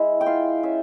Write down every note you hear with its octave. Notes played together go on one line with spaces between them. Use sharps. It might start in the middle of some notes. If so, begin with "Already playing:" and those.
Already playing: G#3 E4
G5
F4 F5
C#4 E5